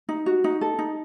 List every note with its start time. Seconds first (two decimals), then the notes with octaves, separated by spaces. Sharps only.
0.09 D#4
0.26 F#4
0.44 D#4
0.61 A4
0.79 D#4